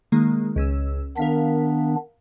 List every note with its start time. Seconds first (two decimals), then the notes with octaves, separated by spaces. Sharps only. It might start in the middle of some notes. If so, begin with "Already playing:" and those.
0.12 D#3 G#3 A#3
0.56 C#2 C#4 E6
1.17 D#3 B3 D4 A#4 F5 B6